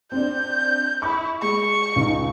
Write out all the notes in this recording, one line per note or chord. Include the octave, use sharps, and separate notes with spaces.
C4 D4 G6
E4 B5 C#6
G#3 C#6
C#2 D#4